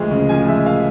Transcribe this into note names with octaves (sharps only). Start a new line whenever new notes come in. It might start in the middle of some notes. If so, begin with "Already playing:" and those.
Already playing: D2 F3 G#3
C#3
F3 G#5
G#3 E5
F5